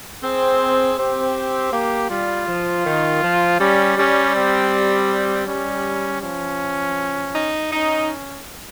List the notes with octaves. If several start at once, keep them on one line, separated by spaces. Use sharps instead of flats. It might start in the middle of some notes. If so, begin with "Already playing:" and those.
C4 G#4
C4 G4
A#3 G4
G3 F4
F3
D#3
F3
G3 C#4
G3 C#4
C4
G3 C#4
F3 C#4
D#4
C#4 D#4